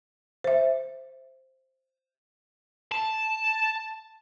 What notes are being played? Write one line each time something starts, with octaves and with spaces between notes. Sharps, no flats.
C5 E5
A5